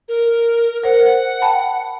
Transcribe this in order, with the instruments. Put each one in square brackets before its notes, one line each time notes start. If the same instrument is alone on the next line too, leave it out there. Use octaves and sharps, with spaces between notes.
[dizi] A#4
[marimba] A#4 C5 [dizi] F#5
[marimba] G5 A5 B5